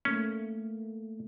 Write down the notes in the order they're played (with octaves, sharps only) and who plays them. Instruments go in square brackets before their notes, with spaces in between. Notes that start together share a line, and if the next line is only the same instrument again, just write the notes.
[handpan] A3 A#3 [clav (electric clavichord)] C#4